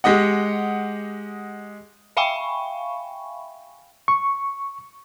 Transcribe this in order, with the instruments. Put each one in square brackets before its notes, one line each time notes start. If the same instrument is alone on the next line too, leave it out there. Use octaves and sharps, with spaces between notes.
[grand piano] G#3 G4 D#5 F#5
[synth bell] E5 F5 G5 G#5 B5 C#6
[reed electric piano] C#6